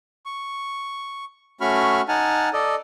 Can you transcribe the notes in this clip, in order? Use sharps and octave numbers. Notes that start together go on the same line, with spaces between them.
C#6
A3 C#4 F#4 B5 C#6 F6
D#4 F#5 G#5 A5 F6
A4 D5 D#5